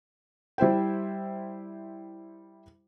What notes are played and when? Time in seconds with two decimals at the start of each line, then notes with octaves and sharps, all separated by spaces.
0.58 G3 E4 C5 G5